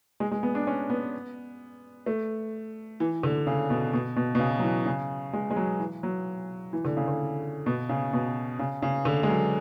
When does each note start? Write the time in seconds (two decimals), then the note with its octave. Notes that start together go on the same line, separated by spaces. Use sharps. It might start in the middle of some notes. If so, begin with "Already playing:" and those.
0.20 G#3
0.31 G#3
0.43 B3
0.55 D4
0.67 C#4
0.90 B3
2.06 A3
3.00 E3
3.23 D3
3.47 C#3
3.70 B2
3.93 B2
4.16 B2
4.35 B2
4.40 C#3
4.59 F#3
4.63 E3
4.86 C#3
5.33 G#3
5.51 G#3
5.56 F#3
5.79 E3
6.03 F#3
6.73 E3
6.85 D3
6.97 C#3
7.08 D3
7.66 B2
7.89 C#3
8.13 B2
8.59 C#3
8.82 C#3
9.05 D3
9.23 G#3
9.29 F#3